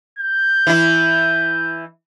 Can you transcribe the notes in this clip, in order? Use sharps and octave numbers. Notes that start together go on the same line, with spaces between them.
G6
E3 E4